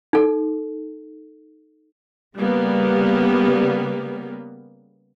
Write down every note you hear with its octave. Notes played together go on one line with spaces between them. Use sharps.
D#4 A4
C#3 G3 A#3 B3